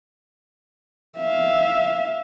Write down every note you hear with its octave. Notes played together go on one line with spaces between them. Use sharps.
E5 F5